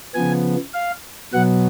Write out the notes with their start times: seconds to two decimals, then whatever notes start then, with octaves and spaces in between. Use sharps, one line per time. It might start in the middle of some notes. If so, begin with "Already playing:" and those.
0.14 C#3 F3 B3 G#5
0.74 F5
1.33 B2 F#3 B3 F#5